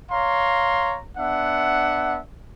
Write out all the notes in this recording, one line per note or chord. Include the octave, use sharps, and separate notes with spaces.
C#5 F5 A#5 C6
B3 D4 E5 F#5